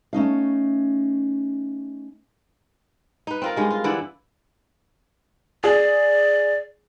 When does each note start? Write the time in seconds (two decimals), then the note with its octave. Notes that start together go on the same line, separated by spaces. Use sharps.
0.13 A3 C#4 D#4 F5
3.27 D#4 B4
3.42 C4 F4 A#4
3.56 G2 G#3 D#4
3.71 F4
3.84 D3 E3 E4 D5
5.64 G#4 D5